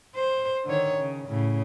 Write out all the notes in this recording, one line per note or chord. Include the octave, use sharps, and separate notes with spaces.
C5
D3 D#3 C#5
C#3
A2 C#3